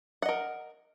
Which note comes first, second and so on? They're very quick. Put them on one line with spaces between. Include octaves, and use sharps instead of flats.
F#5 D#5 A#4